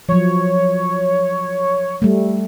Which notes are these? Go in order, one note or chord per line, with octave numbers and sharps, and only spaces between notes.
F3 F#3 C#5
G3 A3